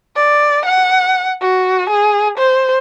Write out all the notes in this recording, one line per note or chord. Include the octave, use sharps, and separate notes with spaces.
D5
F#5
F#4
G#4
C5